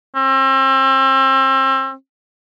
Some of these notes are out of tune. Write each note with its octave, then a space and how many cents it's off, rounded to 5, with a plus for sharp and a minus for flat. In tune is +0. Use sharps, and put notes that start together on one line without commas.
C4 +35